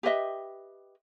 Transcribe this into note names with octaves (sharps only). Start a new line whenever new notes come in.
G4 B4 D#5 E5